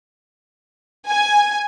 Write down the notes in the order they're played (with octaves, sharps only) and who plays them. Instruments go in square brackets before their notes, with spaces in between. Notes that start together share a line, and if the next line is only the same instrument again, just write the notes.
[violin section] G#5